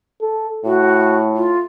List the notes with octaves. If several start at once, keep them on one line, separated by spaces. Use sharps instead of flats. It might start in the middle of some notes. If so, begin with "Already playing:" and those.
A4
A2 F#4
F4